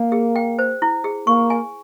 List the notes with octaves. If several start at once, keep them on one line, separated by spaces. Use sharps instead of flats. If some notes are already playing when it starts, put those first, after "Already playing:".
Already playing: A#3
G#4
G5
C5
E4
G#4
A#3 C#6
G#5